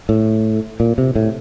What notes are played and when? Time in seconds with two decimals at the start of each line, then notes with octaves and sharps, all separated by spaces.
0.09 A2
0.80 A#2
0.98 C3
1.15 A2